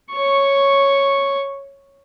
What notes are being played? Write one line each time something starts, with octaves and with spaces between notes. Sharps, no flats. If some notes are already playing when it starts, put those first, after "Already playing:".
C#5 C#6